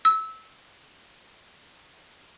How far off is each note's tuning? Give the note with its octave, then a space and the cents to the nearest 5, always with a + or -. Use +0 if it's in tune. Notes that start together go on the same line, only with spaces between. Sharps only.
E6 -20